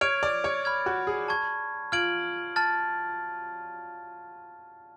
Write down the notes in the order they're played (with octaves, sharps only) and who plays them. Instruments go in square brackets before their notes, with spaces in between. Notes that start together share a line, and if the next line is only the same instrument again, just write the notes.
[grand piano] C#5 [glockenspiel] F6 G#6 D7 F7
[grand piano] D5
C#5
[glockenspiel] B5 F6 G#6
[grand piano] F#4
G#4
[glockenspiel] A5 C#6 G#6
[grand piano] F4 [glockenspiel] F6 G#6 D7 F#7
[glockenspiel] A5 F6 A6